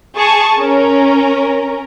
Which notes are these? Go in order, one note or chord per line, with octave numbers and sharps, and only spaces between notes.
G#4 A5 C#6
C#4 A#4